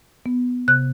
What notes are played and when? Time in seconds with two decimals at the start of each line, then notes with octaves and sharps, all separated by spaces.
0.26 B3
0.68 C3 F#6